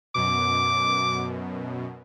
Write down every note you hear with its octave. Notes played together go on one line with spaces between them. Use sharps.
F#2 B2 D6